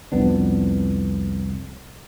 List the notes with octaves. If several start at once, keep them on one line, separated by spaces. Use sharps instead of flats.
C2 F2 B3 D4